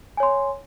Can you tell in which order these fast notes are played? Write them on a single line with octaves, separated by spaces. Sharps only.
G#5 C#5 C6